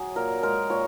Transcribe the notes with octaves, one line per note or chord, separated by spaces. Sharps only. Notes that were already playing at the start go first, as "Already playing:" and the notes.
Already playing: F#3 G#4
A#2 A#4
G#3 A#4
A#2 C#5